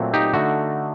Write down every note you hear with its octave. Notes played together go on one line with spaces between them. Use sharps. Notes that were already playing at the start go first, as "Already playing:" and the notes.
Already playing: A#2 F#3 A3 C4
D#4 G4
D3 A3 D#4 F#4